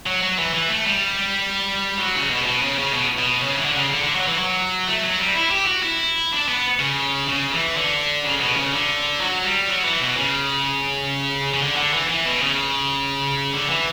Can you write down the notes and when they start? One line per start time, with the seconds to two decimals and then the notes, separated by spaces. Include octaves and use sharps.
0.06 F#3
0.22 F#3
0.38 E3
0.54 E3
0.70 A3
0.86 G3
1.98 F#3
2.15 C#3
2.30 B2
2.46 B2
2.63 C#3
2.79 C#3
2.94 B2
3.19 B2
3.42 C#3
3.56 E3
3.65 D3
3.75 C#3
3.90 D3
4.04 D3
4.15 F#3
4.27 E3
4.38 F#3
4.87 A3
5.03 F#3
5.19 G3
5.35 E4
5.51 G4
5.67 F#4
5.83 E4
6.32 D4
6.48 B3
6.79 C#3
7.28 C#3
7.52 E3
7.77 D3
8.24 C#3
8.40 B2
8.56 C#3
8.72 D3
9.20 F#3
9.44 G3
9.68 F#3
9.85 E3
10.01 B2
10.17 C#3
11.54 C#3
11.61 D3
11.77 D3
11.93 E3
12.09 E3
12.25 B2
12.42 C#3
13.53 D3
13.69 E3